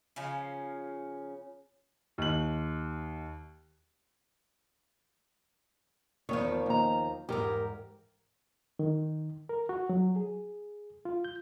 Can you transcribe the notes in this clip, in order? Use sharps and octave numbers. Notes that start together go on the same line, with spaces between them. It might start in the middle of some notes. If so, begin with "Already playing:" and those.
C#3 F3 C#4
D#2 F#7
E2 B2 D#3 F3 C#5
D#2 A#5
E2 G#2 G4 A#4
D#3
A#4
F#4
F#3
G#4
F4
G6